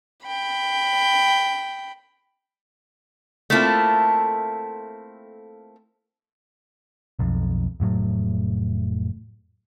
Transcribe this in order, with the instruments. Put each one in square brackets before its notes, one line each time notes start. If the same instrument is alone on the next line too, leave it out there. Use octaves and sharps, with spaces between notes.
[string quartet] G5 B5
[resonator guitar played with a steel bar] A3 A#3 C4 E4 F4 A4
[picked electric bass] B1 F2
F1 A2 F#3